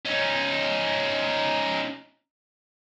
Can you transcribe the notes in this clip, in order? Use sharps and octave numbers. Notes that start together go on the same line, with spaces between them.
C#4 D#4